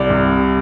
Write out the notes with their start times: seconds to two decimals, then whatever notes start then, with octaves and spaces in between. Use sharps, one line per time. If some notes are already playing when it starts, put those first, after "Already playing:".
Already playing: C2 D5
0.10 C3